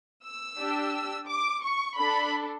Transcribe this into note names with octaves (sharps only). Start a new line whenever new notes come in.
E6
D4 G4
D6
C#6
D4 A4 B5